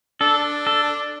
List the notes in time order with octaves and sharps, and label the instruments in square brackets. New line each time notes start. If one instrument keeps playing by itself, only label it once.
[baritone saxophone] D4 [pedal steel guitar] A4
[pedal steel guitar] A4